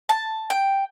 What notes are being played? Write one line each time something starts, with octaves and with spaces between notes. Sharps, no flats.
A5
G5